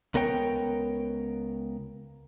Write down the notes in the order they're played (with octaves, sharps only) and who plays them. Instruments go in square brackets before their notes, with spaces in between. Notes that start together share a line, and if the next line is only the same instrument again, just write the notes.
[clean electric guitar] C#2 B3 A#4 C#5 G5